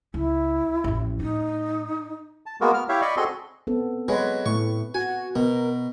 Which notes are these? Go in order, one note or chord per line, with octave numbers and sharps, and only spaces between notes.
C#2 E4
A1 F2
A2 D#4
A5
G#3 A#3 B3 F#4 A#4
B3 F6
E4 G4 C#5 E5 F5
D5 D#5 B5 C#6
C4 F#4 G#4 A4 D#5 C6
B3 C4 A4
F#3 G#3 B4
A2 C#6
F#4 G#5
B2 B3 A#4